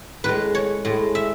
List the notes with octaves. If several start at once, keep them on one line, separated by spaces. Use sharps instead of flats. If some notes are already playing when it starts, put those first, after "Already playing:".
A2 G#3 B4
C#5
A2 G#3
E5